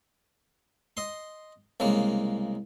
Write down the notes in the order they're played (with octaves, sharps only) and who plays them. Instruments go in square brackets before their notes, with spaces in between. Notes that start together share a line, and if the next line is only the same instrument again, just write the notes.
[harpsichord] D#5 C6
C2 C#3 G#3 A#3